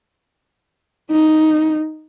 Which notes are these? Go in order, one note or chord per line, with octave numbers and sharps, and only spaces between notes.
D#4